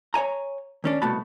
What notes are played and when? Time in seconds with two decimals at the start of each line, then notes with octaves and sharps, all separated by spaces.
0.14 C#5 D5 G#5 A#5
0.84 D#2 C#4 D4
1.02 C2 B2 A3 F#4 A5 B5